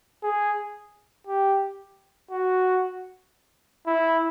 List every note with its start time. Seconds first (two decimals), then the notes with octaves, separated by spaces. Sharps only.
0.23 G#4
1.27 G4
2.31 F#4
3.87 E4